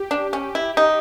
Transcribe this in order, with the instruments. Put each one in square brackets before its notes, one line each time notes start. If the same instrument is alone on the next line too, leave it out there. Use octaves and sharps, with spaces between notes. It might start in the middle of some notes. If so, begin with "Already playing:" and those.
Already playing: [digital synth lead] G4
[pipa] D4
C#4
E4
D#4